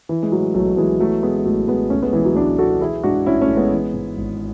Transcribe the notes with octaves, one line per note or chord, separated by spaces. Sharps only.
E3
G#3
A2 F#3
B1 F#3 A3
B1 E3 G#3
E3 F#3 A3
A2 G#3 B3
G#3
A1 F#3 A3
A1 G#3 B3
C#2 A3 C#4
G#3 B3
B2 E3 G#3
F#3
C#2 B3 D4
B2 F#4 A4
E3 E4 G#4
G#2 D4 F#4
A1 C#4 E4
A3 C#4
A1
G#3 B3
E3
G#2
G#1